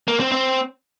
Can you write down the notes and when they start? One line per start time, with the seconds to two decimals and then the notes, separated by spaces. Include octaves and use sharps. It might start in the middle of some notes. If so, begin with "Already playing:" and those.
0.08 A#3
0.20 C4
0.32 C4